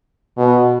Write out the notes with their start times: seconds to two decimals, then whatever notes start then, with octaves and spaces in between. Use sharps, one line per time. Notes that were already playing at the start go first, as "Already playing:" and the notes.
0.38 B2